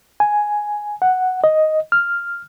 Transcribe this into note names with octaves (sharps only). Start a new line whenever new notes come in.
G#5
F#5
D#5
F6